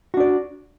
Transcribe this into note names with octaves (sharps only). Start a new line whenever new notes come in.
D4 F#4 D5